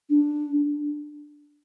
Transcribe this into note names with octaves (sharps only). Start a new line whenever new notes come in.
D4